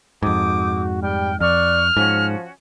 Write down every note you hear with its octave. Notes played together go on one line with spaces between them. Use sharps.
F2 G#2 F#4 D6 D#6 G6
G3 G5 F6
F2 D5 C#6 F6 F#6
G#2 F3 C#4 F#4